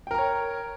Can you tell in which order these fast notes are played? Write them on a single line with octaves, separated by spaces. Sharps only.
G5 A#4 A#5 C#5